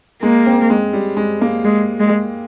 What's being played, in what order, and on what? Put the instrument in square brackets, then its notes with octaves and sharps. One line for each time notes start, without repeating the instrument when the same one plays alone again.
[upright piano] G#3 [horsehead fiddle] A#3
[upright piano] C4
G#3
G3
G#3
A#3
[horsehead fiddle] G#3
G#3